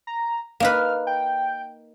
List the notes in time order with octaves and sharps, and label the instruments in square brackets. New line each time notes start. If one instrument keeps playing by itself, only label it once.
[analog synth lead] A#5
[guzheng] A#3 D#4 B4 [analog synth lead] F6
[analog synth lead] G5